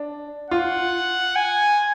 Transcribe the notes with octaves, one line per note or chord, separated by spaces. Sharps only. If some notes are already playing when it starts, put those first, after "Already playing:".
Already playing: D4
F4 F#5
G#5